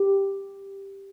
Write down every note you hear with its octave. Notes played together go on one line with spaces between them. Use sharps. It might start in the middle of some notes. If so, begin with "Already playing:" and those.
Already playing: G4